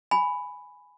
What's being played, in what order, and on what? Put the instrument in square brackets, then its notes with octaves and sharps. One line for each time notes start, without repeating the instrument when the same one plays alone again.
[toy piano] G#5 B5